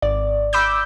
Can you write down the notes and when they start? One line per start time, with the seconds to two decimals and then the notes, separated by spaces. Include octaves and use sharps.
0.02 G#1 D5
0.53 B5 D6 E6 G6